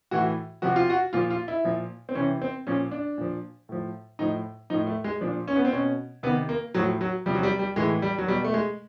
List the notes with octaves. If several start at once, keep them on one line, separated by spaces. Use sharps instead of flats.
A2 E3 F#4
C3 F3 F#4
F4
F#4
A#2 F3 F4
F4
E4
A#2 F3
C4
C3 E3 C#4
C4
A#2 F3 C#4
D4
A#2 F3
A2 F3
A2 F3 D#4
A2 F3 D#4
A3
G#3
A#2 F3 D4
C#4
B3
C4
B2 C#4
C3 D#3 B3
A#3
A2 F3 F#3
F#3
C3 F3 G3
F#3
G3
G3
A2 E3 G#3
G3
F#3
B2 G3
A3
G#3